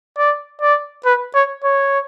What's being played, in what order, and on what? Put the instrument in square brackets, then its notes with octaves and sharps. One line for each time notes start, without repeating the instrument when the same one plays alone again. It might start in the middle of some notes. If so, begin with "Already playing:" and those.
[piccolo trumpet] D5
D5
B4
C#5
C#5